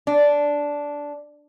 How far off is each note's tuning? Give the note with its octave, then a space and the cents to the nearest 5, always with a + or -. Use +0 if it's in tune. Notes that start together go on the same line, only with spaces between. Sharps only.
D4 -10